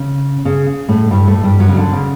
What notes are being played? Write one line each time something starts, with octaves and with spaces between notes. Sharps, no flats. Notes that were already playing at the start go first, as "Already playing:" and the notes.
Already playing: C#3
C#3
A2 A3
G2 G3
A2 A3
G2 G3
F#2 F#3
C#3
D2 D3
C#3